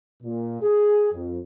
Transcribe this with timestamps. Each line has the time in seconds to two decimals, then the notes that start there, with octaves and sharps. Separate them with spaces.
0.23 A#2
0.61 G#4
1.13 F2